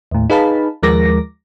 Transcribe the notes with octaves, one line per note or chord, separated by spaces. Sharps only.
D#2 A2
D#4 G#4 B4 F5 A5 B5
D#2 F3 G#3 A#4 D6 A#6